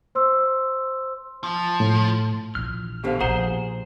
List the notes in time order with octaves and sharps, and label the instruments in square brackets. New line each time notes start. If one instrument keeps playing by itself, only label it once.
[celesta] C5 C6 E6
[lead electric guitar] F3
[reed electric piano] A2
[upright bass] A#1 E3 [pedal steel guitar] F6
[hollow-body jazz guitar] D2 B2 D3 [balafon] G4 C5 F5
[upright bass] A#1 [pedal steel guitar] G#4 C5 [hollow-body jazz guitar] F#5 [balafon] A#5